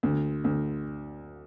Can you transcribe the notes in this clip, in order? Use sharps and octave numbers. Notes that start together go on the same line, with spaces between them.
D2
D2